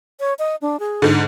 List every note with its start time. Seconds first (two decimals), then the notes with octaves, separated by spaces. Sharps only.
0.20 C#5
0.39 D#5
0.62 D4
0.80 G#4
1.02 G#2 D3